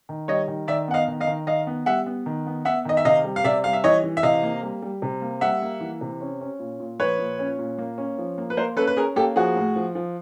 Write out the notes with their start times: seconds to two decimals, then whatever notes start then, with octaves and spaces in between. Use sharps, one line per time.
0.09 D#3
0.28 G3 C#5 D#5
0.48 D#3
0.68 D#3 D5 E5
0.88 B3 F#5
0.94 D#5 F5
1.08 D#3
1.20 D#5 F5
1.27 D#3
1.47 D#3 D#5 F5
1.67 B3
1.86 G3 E5 F#5
2.06 B3
2.26 D#3
2.46 B3
2.65 B3 E5 F#5
2.85 D#3 D#5
2.97 E5
3.05 C3 D#5 F5
3.24 G3
3.36 F5
3.44 C3 D5 E5
3.64 G3 F5
3.73 E5
3.84 E3 C#5 D#5
4.04 E3
4.17 E5
4.23 C3 D#5 F5
4.43 A#3
4.62 G3
4.82 G3
5.02 C3
5.22 A#3
5.41 G3 E5 F#5
5.62 A#3
5.81 E3
6.01 C3
6.21 C#4
6.41 C#4
6.60 A#2
6.80 A#2
7.00 F3 B4 C#5
7.19 A#2
7.39 C#4
7.59 A#2
7.78 A#3
7.98 C#4
8.18 F3
8.38 A#3
8.50 B4
8.57 A#3 A#4 C5
8.76 C#4 A4 B4
8.87 B4
8.96 C#4 G#4 A#4
9.16 A#3 G4 A4
9.36 F3 F#4 G#4
9.55 A2
9.76 F3
9.95 F3